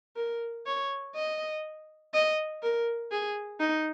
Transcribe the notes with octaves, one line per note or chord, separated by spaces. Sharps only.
A#4
C#5
D#5
D#5
A#4
G#4
D#4